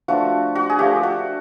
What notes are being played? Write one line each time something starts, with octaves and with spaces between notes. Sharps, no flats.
F3 A3 D4 F#4
F#4
G#4
F3 A3 D4 G4
F#4